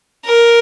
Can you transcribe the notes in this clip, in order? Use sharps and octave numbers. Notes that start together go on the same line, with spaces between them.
A#4